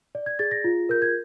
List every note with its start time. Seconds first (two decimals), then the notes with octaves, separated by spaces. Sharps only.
0.15 D5
0.26 G#6
0.39 G#4 A6
0.51 A#6
0.64 F4
0.89 A#4 G6
1.02 G#6